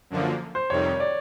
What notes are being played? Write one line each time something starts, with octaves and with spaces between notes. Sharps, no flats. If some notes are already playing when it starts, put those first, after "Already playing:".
F#2 D3 F3 A#3
C5
F2 C3 D#3 G3 C#5
D5